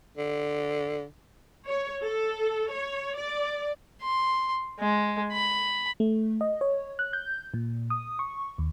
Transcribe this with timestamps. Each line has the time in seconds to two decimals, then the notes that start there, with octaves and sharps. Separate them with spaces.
0.17 D3
1.67 C#5
2.04 A4
2.71 C#5
3.17 D5
4.02 C6
4.79 G#3
5.32 B5
6.00 A3
6.41 D#5
6.61 C#5
6.99 F#6
7.13 G6
7.54 A#2
7.90 D#6
8.19 C#6
8.58 D#2